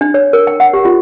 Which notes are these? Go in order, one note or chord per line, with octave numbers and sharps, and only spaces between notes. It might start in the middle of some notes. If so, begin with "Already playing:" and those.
D4
C#5
A#4
G5
F#5
G4
F4